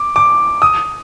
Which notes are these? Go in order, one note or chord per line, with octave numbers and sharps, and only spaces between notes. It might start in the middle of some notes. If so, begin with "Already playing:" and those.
Already playing: D6
D6
D#6